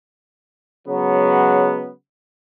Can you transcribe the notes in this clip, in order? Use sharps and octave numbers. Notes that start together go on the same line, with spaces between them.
C#3 F#3 G#3 B3